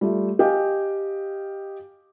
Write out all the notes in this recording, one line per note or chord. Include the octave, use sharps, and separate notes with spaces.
G3 A3 F4
G4 D#5 F5 G5 G#5